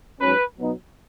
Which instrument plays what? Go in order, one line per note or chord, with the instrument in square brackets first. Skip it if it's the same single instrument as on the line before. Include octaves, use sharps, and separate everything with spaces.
[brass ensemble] G#2 F#3 C#4 [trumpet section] B4
[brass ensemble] B2 F#3 B3 D#4